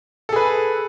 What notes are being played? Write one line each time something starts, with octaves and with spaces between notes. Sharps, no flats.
G#4 A4 B4